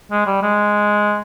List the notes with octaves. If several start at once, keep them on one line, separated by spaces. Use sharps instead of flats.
G#3
G3
G#3